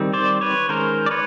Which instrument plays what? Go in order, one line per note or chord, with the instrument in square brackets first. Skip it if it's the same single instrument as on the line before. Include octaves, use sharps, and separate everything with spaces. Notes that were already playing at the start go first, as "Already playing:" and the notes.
Already playing: [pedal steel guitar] D#3 G3 C4
C5 D5
B4 C#5
D#3 G#3 C#4 A#4 C5
D5
B4 C#5